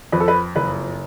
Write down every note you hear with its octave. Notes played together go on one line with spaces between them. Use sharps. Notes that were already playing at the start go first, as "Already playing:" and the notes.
F2 B4
A4
B4
F#1 B4